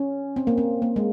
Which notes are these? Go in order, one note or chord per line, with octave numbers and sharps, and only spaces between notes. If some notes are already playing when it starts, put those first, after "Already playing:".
Already playing: C#4
C4
A#3
C4
A#3
G#3